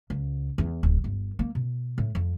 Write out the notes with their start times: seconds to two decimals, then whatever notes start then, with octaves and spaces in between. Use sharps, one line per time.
0.10 C#2
0.58 E2
0.83 D1
1.04 G1
1.39 A#3
1.55 B2
1.98 A2
2.15 F2